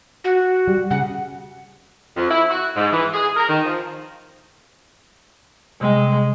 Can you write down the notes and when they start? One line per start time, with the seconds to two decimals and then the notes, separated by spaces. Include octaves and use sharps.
0.24 F#4
0.68 G3
0.91 C#3 F#5
2.17 F2
2.31 E4
2.50 F#4
2.76 G#2
2.93 E3
3.14 G#4
3.37 A#4
3.49 D#3
3.65 F3
5.81 C3 G3 G#3